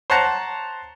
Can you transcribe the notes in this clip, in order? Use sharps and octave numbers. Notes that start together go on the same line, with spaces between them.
C5 C#5 F#5 A5 A#5